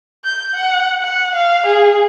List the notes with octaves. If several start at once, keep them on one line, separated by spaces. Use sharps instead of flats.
G6
F#5
F#5
F5
G#4